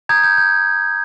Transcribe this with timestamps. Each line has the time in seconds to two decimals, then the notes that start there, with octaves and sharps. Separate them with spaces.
0.09 A#5 D#6 G6 G#6
0.24 G6
0.38 G6